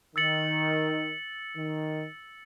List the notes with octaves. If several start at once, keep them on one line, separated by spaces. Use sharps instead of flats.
D#3 E6 A6 C#7 F#7
D#3